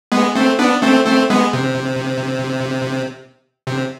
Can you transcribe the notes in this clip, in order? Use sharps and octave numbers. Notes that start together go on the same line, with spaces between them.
G#3 B3
A3 C4
B3 D4
A3 C4
A3 C4
G#3 B3
C3
C3